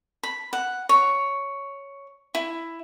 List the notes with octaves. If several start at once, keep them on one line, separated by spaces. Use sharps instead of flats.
B5
F#5
C#5
E4